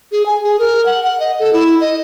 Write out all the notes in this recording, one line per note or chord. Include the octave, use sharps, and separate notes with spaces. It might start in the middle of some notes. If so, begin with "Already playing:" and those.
G#4
G#5
G#4
A#4
F#5
F#5
D#5
A4
E4
D#5